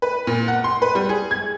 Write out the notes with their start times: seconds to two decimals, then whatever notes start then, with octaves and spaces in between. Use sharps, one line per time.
0.02 B4
0.27 A#2
0.48 F#5
0.64 C6
0.82 B4
0.95 G3
1.09 G#4
1.31 G#6